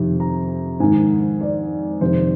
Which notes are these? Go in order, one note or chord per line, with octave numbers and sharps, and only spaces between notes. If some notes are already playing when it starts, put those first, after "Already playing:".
Already playing: F2 C3 D#3
A#5
G#2 D#3 G#5
D5
F2 C3 D#3 C5